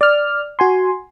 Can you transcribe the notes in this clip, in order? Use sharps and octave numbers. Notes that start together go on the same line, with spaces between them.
D5 F6
F#4 G#5 C6